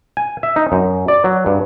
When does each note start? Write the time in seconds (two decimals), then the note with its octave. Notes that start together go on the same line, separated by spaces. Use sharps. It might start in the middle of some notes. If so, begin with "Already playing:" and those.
0.17 G#5
0.43 E5
0.56 D#4
0.72 F#2
1.08 D5
1.24 F#3
1.46 G2